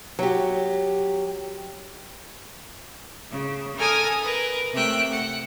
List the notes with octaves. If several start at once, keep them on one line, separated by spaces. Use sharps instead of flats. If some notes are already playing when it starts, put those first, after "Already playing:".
F#3 G4
C#3
A4 A#4 G#5 D#6 F6
A#4 B4
C3 A3 E5 G5 F#6
F#5